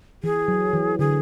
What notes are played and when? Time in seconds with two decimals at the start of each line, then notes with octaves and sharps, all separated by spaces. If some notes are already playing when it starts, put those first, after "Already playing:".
0.23 E3 G#4
0.48 F#3
0.74 E3
0.99 D3 G#4